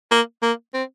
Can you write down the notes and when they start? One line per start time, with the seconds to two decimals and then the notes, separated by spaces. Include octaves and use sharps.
0.12 A#3
0.43 A#3
0.74 C4